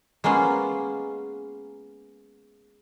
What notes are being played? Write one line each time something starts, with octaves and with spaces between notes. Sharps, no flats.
G#3 A#3 B3 C#4 F4